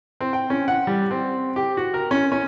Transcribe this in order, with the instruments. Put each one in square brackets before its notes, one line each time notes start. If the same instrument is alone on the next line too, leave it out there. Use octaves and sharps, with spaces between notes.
[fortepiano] C4
G5
C#4
F#5
G3
C4
G4
F#4
A#4
C#4
C#4